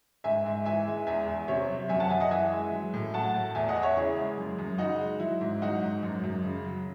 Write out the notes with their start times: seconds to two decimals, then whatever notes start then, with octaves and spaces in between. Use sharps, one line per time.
0.24 G#2 E5 G#5
0.45 G#2
0.65 E3 E5 G#5
0.86 G#3
1.07 E2 E5 G#5
1.28 E2
1.48 C3 C#5 E5
1.69 F#3
1.89 F#2 E5 G#5
2.00 F#5 A5
2.10 F#2 E5 G#5
2.20 D#5 F#5
2.31 E3 E5 G#5
2.52 G#3
2.72 F#3
2.94 A2
3.14 F#3 F#5 A5
3.34 A2
3.55 E2 E5 G#5
3.68 D#5 F#5
3.76 E2
3.82 C#5 E5
3.96 C#3 E4 G#4
4.17 G#3
4.37 F#2
4.59 F#2
4.78 C#3 D#4 F#4
4.99 G#3
5.20 F#3 E4
5.41 G#2
5.61 F#3 D#4 F#4
5.81 G#2
6.03 F#2
6.24 F#2
6.44 C#3
6.65 F#3